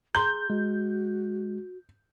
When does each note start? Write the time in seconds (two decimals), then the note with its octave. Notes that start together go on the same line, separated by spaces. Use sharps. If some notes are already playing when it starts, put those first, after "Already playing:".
0.15 G#4 A#5 C6 G6
0.50 G#3 F#4